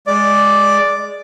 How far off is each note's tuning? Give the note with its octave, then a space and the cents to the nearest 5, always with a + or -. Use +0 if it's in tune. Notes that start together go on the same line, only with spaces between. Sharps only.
G#3 +0 D5 +0